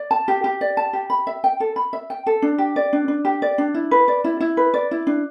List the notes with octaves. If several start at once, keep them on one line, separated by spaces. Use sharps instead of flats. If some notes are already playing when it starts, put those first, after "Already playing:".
Already playing: D5
A5
G4
G4
D5
A5
G4
B5
E5
G5
A4
B5
E5
G5
A4
D4
G4
D5
D4
D4
G4
D5
D4
E4
B4
D5
E4
E4
B4
D5
E4
D4